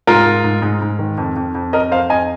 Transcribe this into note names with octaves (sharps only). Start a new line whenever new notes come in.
G#2 F4 A#4
G#2
G#2
G#2
G#2
D#3
F2
F2
F2
F2 A#4 D#5
F2 C5 F5
F2 D#5 G#5